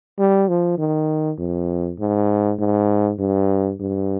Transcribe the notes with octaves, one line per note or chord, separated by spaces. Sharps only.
G3
F3
D#3
F2
G#2
G#2
G2
G2